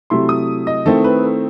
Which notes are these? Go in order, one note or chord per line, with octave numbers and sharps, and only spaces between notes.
C3 F#3 A3 E4 C6
D#6
D#5
D#3 A3 C4 E4 A4
B4
A4